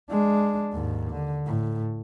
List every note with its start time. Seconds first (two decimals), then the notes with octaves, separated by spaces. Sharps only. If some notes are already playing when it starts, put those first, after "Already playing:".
0.10 G#3 D4
0.73 D#2 G#2
1.11 D3
1.46 A2